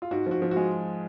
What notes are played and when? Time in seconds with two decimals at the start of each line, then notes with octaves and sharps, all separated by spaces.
0.02 F4
0.11 G#2 F#4
0.26 F3 F#4
0.42 F3
0.51 F#4
0.56 G#3